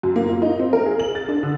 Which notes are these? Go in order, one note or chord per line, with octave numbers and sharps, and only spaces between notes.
F#2
A#3
F4
D#4
C4
A#4
G#4
F#7
A6
D4
D3